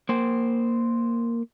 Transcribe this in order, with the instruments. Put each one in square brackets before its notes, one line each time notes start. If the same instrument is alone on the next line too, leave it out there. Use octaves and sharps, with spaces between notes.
[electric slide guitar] A#3 C5